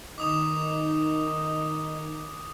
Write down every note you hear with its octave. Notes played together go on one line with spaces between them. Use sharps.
D#3 D#4 D6 D#6 F7